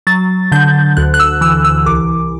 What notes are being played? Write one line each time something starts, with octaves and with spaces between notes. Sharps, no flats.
F#3 A6
D3 G6
D2 F#6
F#6
E6
E3 E6
E6
C2 D6